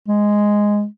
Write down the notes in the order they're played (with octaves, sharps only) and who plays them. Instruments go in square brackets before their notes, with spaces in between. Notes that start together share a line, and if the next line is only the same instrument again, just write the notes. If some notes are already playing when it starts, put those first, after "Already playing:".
[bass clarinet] G#3